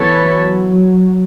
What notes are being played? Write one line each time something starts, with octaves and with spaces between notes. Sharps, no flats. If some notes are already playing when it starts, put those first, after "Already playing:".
Already playing: E3 B3 A4 C#5
F#3